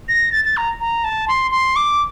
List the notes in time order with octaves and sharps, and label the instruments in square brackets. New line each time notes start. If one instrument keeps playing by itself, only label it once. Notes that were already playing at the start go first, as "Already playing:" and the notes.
[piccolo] A#6
A6
A6
A#5
A#5
A5
C6
C6
D6